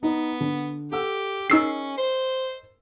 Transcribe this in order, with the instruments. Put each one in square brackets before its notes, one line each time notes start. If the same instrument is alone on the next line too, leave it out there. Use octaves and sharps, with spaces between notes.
[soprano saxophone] B3 [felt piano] D#4
[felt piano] D3
[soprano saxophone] G4 [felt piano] A4 F#5 E6
[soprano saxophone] C#4 [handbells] D#4 E6 C7 [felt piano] G#4 A#4 D#5
[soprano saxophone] C5